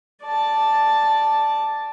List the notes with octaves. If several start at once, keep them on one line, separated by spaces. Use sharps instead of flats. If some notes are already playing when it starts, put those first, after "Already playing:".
D5 A5